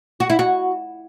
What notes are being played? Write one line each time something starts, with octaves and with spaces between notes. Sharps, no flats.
F#4
E4
F#4